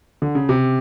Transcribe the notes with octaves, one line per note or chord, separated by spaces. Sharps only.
D3
C#3
C3